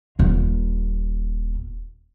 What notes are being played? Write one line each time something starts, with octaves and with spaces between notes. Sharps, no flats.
D#1 A#3